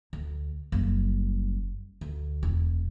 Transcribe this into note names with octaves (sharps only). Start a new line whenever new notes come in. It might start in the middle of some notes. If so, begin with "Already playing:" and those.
D2
F#1 G3
D2
E1